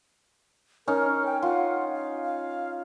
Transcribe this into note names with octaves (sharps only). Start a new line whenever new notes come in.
C#4 D#4 A#4
G5
F4 F#5
F5
F5